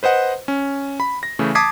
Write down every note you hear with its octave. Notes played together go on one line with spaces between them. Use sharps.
B4 C5 D#5 F#5
C#4
B5
A#6
C#3 E3 A3
A5 D6 D#6 G#6 B6 C7